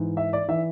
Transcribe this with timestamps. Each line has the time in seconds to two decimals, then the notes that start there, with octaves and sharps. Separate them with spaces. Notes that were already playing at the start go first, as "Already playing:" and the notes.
Already playing: G#2 E3
0.17 E5
0.33 D5
0.48 E3 E5